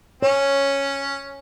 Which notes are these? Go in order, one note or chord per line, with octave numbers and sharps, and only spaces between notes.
C#4 C#5